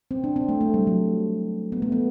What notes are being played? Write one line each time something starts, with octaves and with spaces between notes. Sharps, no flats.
C4
D4
C4
A3
A3
G3
F#3
B3
A3
B3